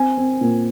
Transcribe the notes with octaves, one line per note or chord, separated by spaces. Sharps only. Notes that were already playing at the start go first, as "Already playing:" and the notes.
Already playing: C4 G#5
C4
A#2